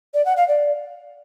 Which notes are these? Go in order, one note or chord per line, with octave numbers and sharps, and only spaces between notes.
D5
F#5
F5
D5